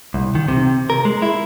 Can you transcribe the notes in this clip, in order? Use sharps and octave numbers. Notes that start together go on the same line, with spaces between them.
C2
D#3
C3
A#4
G#3
E4